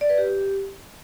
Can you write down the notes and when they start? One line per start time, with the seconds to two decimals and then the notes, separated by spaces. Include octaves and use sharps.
0.01 D5
0.09 B4
0.18 G4